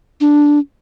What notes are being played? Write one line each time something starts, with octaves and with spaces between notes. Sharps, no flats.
D4